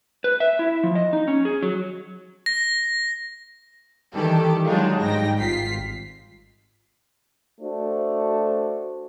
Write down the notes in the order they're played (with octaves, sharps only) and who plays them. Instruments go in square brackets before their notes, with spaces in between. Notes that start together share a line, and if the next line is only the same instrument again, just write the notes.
[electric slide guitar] B4
E5
E4
F3
D#5
D#4
C#4
G#4
F#3
[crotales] A#6
[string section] D#3 E3 G3 G4 A4
D#3 F#3 G#3 D4 D#4 F4
G#2 G3 D#4 G5 A#6
G#1 F4 B6 C7
[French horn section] A3 D4 F#4 C5